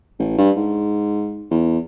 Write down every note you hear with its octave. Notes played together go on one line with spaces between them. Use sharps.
A1
G2
G#2
E2